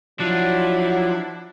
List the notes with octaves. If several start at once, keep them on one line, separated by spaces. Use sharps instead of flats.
F3 F#3 D4 E4